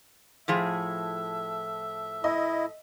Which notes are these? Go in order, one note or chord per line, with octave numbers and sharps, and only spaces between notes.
A2 F3 G#4 E5
E4 D#5